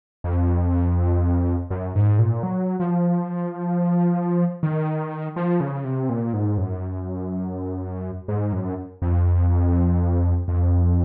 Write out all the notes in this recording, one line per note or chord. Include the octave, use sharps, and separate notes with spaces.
F2
F#2
G#2
A#2
F#3
F3
D#3
F3
C#3
C3
A#2
G#2
F#2
G#2
F#2
F2
F2